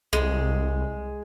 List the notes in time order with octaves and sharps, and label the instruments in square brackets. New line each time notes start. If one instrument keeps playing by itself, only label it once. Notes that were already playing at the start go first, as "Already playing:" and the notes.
[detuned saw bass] C2 [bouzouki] G#3